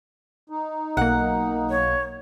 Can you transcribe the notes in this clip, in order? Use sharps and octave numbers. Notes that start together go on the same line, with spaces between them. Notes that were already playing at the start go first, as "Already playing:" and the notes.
D#4
B1 A#3 F#5
C#5